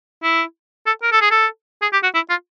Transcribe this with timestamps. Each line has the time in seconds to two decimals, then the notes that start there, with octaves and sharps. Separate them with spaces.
0.23 E4
0.87 A4
1.03 A#4
1.12 A4
1.22 G#4
1.31 A4
1.82 G#4
1.93 G4
2.03 F#4
2.15 E4
2.30 F4